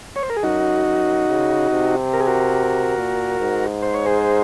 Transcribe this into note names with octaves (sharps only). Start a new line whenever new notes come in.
C#5
C5
A#4
G#4
F#2 D#4 F#4
F#2
C#3
C3
A#4
G#4
F#4 A#4
A#2
G#2
C5
C#5
G#4 C5